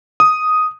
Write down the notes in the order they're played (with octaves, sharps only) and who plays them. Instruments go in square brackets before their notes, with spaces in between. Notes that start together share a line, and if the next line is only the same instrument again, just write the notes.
[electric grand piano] D#6